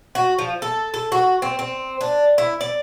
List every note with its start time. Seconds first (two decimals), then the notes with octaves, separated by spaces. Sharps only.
0.15 F#4
0.39 F3
0.62 A4
0.94 A4
1.12 F#4
1.42 C4
1.59 C4
2.01 D4
2.38 E4
2.61 D5